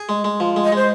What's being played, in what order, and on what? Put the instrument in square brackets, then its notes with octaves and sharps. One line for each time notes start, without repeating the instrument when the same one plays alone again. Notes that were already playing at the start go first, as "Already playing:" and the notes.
Already playing: [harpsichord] G#4
G#3
G#3
F3
G#3
[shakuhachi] D#5
[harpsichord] G#3 [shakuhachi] C5